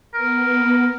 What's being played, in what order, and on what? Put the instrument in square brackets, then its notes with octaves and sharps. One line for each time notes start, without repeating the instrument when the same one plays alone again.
[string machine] B3 [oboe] A#4